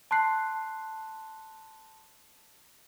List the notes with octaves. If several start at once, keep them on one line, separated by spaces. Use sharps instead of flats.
A5 C6 F#6 C7